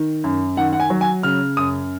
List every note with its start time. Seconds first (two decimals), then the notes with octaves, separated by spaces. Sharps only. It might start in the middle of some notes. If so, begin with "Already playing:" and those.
Already playing: D#3
0.24 F#2
0.57 D#3 F#5
0.73 F#5
0.80 G#5
0.90 F#3
1.01 G#5
1.23 C#3 F6
1.57 F#2 D#6